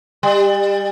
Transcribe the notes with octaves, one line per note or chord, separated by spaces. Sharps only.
G3